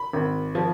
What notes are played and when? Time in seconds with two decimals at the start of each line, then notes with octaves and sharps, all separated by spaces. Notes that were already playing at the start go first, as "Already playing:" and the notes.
Already playing: B5
0.13 G#1
0.55 F3